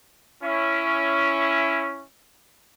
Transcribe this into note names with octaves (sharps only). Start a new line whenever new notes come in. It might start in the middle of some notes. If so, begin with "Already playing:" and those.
C#4 E4